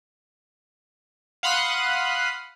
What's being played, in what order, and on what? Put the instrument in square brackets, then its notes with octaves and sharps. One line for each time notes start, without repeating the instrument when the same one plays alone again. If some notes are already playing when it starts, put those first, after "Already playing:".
[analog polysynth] F5 F#5 B5 C6 D#6 F#6